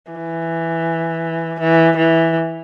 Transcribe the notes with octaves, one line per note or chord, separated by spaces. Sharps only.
E3
E3
E3